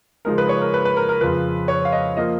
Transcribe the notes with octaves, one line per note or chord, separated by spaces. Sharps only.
C#3 F3 G#3 D#4 A#4
B4
C#5
A#4
B4
B4
A#4
A#4
F2 C#3 F3 B4
C#5
F5
D#5
F3 A#3 F4 D#5